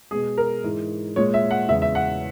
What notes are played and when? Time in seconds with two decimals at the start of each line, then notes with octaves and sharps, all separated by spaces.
0.11 B2 G#3 G#4
0.38 A#4
0.64 G#2 E3 G#3
1.16 A#2 G#3 C#5
1.34 E5
1.51 F#5
1.69 E2 C#3 G#3 E5
1.82 E5
1.95 F#5